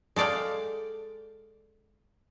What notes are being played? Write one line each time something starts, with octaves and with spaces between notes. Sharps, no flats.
G#3 A4 D5 F5 G5